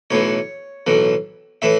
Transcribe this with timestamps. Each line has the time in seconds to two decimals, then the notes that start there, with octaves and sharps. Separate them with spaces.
0.10 B1 A2 E3 C#5
0.86 B1 A2 E3
1.62 A2 E3 E5